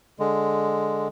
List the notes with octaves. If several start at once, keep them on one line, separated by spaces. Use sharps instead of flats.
D3 G#3